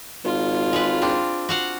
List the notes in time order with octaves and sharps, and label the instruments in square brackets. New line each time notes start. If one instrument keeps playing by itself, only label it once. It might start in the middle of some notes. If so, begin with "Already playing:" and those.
[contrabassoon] G#1 [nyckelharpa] F4
[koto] G#3 B4
C4 D4
F#4 F5 F#5